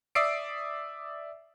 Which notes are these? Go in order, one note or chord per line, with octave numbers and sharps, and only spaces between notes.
D5 E5 D#6 E6 C7 D7